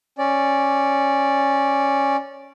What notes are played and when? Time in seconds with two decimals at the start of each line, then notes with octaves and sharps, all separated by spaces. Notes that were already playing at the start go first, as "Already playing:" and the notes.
0.18 C#4 D5